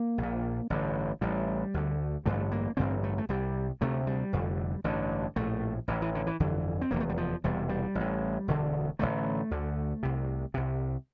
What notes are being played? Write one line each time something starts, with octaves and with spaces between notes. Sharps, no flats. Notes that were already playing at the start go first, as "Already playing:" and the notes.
Already playing: A#3
A#1 A#2
A1 G2 D3
A1 A2 G3
D2 D3
A1 G2 D3 A3
A#3
A1 G2 D3 C4
A3
A3
C2 C3 G3
D2 C3 A3
G3
F1 F2 D3
A1 G2 D3
A#1 A2 A3
A1 A2 E3
E3
D3
E3
G1 F2 D3 E3
C4
F1 E2 D3 A#3
A3
G3
F3
E1 E2 C3 G3
G3
A1 A2
E1 D2 D3
A1 G2 D3 A3
D2 D3
C2 C3
C2 C3